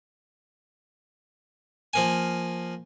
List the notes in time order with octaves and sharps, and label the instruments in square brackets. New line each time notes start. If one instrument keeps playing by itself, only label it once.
[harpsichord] F3 A#3 G#5